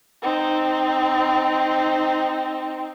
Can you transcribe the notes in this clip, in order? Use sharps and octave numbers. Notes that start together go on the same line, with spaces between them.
C4 D#4